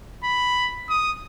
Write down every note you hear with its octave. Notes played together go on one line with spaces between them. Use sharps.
B5
D#6